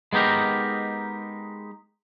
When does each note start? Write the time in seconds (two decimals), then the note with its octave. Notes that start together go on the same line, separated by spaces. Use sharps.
0.13 G#3 B3 D#4 G4 A#4